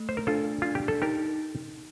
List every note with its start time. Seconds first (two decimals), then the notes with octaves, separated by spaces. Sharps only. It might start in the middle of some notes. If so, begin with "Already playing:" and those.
Already playing: A3
0.09 C5
0.17 A#4
0.27 D4 F4 A4
0.62 D4 F4
0.75 G4
0.88 A4
1.02 D#4 G4 A#4